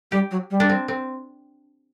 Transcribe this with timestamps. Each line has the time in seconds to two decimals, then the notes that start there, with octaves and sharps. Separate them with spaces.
0.12 G3 G4
0.31 F#3
0.51 G3
0.60 D4
0.69 C4
0.88 C4